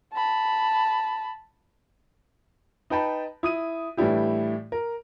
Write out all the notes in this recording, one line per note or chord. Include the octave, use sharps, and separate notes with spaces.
A5 B5
D#4 B4 G5 A5 B5
E4 D#6 D#7
A2 E3 G3 D4 E4 G4
A#4